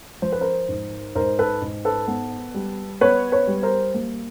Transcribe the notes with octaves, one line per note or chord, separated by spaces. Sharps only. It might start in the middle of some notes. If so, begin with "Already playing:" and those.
F3 C5
B4
A#4 C5
G#2
G#2 A#4 C5
A4 B4
G#2
A4 B4
B3
G3
B3 B4 C#5
B4 C#5
G3
A#4 C5
A#3